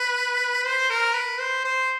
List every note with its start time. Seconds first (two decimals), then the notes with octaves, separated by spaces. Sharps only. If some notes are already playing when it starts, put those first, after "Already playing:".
Already playing: B4
0.64 C5
0.90 A#4
1.14 B4
1.40 C5
1.65 C5